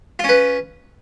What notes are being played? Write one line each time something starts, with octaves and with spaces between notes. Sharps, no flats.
C#4 F4 B4